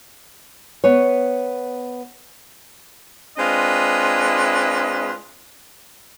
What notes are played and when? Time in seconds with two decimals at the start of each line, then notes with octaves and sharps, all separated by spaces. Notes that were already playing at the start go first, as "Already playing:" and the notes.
0.84 B3 B4 C#5
3.38 G#3 C4 D4 F4 B4 D#5